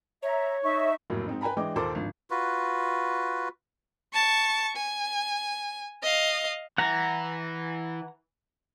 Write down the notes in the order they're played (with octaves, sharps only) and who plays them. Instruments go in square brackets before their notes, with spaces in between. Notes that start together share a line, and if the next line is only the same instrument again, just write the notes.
[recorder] C#5 [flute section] E5 A#5
[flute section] D#4 E5 C#6
[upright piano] F1 A2 F#3 A#3 E4
G#2 C4 D#4
B4 G5 G#5 A#5 B5
E3 G#3 D4 D#5 G5 D6
D#2 A#2 A#3 A4 C5 D6
G#1 D3 F3
[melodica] F4 F#4 B4
[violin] A5 C#6
G#5
D#5 F5
[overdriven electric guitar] E3 [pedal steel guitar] F#5 A#5